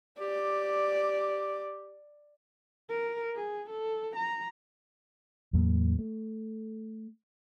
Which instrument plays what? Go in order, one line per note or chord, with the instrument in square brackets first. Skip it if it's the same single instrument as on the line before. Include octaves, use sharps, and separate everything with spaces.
[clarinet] G4 [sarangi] D5
[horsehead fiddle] A#4
G#4
A4
A#5
[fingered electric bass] E2 A2 F#3 A#3
A3